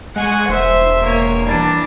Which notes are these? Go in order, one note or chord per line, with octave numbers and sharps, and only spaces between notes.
G#3 F#5 G#5 C#6
E1 C5 E5
A#3 C#5
E3 G3 D4